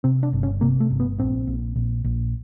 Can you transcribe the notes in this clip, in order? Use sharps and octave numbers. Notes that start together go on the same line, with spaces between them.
C3 C4
D4
G1
C#4
C3 A#3
A3
G1
B3
A#1 C4
A#1
A#1
A#1